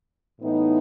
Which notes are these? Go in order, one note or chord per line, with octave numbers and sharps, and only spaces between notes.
A2 E3 B3 D#4